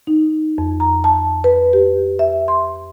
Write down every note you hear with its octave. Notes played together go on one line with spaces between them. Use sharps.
D#4
F2
A#5
A5
B4
G4
E5
C6